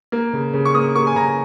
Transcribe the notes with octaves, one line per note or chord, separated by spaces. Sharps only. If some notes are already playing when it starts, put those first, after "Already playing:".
A#3
C#3
C#3
C#6
A#3 D#6
A#3 C#6
G#5
C#3 A#5